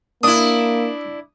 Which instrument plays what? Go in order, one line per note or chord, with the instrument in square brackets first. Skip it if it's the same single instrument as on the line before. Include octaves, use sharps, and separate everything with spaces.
[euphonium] A#3 [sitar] D4 E4 [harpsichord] D#6